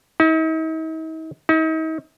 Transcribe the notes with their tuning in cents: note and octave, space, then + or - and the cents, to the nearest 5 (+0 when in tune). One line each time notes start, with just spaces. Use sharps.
D#4 +45
D#4 +40